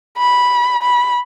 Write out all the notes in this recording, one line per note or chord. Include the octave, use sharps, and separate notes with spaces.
B5
B5